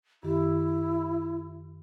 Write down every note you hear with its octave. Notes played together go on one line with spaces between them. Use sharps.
F#2 D#3 E4 G4